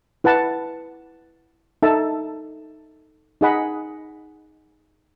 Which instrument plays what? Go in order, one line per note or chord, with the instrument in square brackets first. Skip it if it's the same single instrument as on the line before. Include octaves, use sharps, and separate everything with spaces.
[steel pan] E4 B4 F#5 A5
D#4 A4 E5 A5
D#4 G#4 D#5 F#5 B5